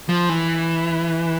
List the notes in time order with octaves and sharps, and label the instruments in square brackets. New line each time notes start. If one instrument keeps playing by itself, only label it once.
[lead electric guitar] F3
E3